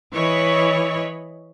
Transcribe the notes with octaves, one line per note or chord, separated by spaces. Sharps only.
E3 C#5 D#5 B5